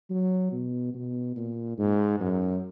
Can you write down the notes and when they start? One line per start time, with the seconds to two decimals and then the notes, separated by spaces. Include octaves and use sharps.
0.10 F#3
0.52 B2
0.94 B2
1.36 A#2
1.78 G#2
2.20 F#2